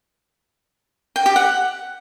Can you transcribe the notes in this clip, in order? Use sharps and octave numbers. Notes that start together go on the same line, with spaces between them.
G5
G4
F#5